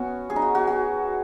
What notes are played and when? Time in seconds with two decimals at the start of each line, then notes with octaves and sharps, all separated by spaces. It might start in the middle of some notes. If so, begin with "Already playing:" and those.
Already playing: B3 C#4 F#4
0.30 G#4
0.36 D#4
0.42 F#4
0.55 F#4
0.67 F#4